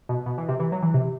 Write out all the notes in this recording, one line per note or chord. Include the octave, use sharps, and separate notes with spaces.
B2
B2
E3
C3
E3
F#3
E3
C3